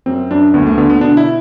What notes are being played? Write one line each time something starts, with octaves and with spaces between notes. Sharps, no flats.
F#2 C4
F#2 D4
D2 B3
A3
D3 B3
B3
B2 D4
E4